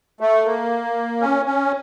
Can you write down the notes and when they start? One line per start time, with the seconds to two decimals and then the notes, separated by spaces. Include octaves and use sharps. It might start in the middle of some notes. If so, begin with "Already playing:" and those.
0.20 A3
0.45 A#3
1.21 C#4
1.46 C#4